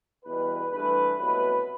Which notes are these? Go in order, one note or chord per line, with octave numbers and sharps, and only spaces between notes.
E2 B2 G3 B4
G2 E3 A3 B4
C2 B2 F#3 A3 B4